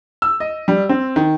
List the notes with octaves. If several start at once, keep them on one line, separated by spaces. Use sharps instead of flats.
E6
D#5
G3
C4
D#3